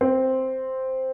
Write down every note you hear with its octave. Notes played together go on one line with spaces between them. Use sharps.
C4 C5